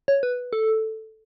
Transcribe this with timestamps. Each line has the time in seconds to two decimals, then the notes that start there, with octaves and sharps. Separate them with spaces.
0.08 C#5
0.23 B4
0.53 A4